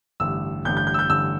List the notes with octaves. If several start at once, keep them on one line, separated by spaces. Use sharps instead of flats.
A1 G2 D3 E6
A1 G2 D3 G6
G6
G6
E6
G6
A1 G2 D3 E6